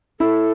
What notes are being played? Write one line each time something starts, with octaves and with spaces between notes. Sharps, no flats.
E4 A4